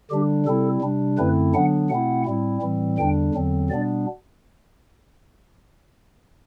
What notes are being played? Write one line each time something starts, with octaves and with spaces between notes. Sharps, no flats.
D3 G3 D4 G4
C3 G3 C4 E4 A4
C3 G3 D4
F#2 D3 A3 C4 E4 B4
D3 F#3 B3 D4 F#5
B2 A3 C4 E4 F#5
A2 G3 C4 E4
A2 E3 G3 C4
E2 D3 G3 D4 G5
E2 D3 F#3 C4
B2 G3 B3 D4 D5